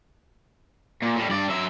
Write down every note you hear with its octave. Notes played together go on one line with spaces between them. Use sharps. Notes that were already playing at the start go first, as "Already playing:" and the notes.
A#2
A2 G3
G2 D5
F#3 E5